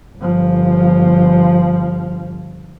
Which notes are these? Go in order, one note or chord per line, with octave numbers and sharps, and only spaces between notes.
G1 F3